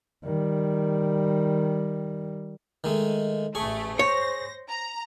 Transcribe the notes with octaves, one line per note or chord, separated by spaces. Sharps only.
D#3 G3
D#3 G#3 A3
A1 A3 G#4 C#6
C5 C#5 A#6
A#5